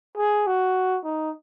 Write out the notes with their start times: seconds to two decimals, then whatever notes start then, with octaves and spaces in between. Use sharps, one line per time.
0.18 G#4
0.47 F#4
1.04 D#4